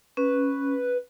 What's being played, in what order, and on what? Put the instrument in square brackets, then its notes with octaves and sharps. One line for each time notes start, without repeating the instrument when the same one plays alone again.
[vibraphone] C#4 [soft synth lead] B4